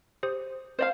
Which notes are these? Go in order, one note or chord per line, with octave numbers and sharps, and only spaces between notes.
G4 C5 D#6
C5 D5 F5